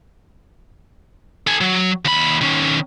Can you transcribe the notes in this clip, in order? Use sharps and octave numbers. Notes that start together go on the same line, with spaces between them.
A4 G#5
F#3
D#2 B5
D#3 C#4